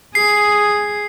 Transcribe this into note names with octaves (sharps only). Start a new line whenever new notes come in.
G#4 C7